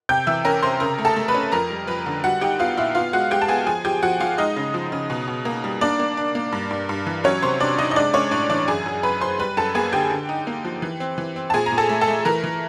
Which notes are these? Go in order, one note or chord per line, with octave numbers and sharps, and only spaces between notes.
C3 G5 G6
E3 E5 E6
C#4 A#4 A#5
C3 C5 C6
C#3 A#4 A#5
A3
A4 A5
A3
B4 B5
C#4
F2 A#4 A#5
G3
F2 B4 B5
D3
G3 F#4 F#5
D#4 G4 G5
B3 F4 F5
A#2 E4 E5
B3 F4 F5
G#3 F#4 F#5
G#3 G4 G5
A5
B3 G#4 G#5
F3 G#4 G#5
F3 G4 G5
F3 F#4 F#5
F3 F4 F5
G#3 D#4 D#5
C#3
F3
C#3
B2
B2
A#3
G3
A#3 D4 D5
A#3
D4
A#3
G2
G2
G2
E3
F#3 C#4 C#5
C3 C5
C3 D4 D5
C3 D#4 D#5
D#5
G#3 D4 D5
G#3 C#4 C#5
A2 D4 D5
E3 D4 D5
F#2 G#4 G#5
F#2
F#2 B4 B5
F#2 C5 C6
G3 B4 B5
F#2 A4 A5
A#3 G#4 G#5
D3 G4 G5
D3
D#4
A#3
F3
E3
C4
E3
C4
A5
A#2 G#4 G#5
A#5
A#2
A4 A5
A3
A4 A5
A3
E3 A#4 A#5
E3